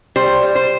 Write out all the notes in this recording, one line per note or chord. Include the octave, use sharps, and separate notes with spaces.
G3 C5
G3
C5